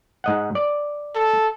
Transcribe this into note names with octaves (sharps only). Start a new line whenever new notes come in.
G#2 D#5 F#5
D5
A4